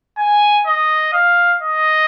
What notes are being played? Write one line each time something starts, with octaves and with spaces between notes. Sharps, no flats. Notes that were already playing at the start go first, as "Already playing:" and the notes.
G#5
D#5
F5
D#5